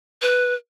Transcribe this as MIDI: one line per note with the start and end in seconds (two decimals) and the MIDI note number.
0.22 0.54 71